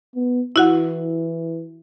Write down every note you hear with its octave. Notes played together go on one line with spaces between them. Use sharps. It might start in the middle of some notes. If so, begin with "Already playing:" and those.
B3
E3 E4 F#4 F#5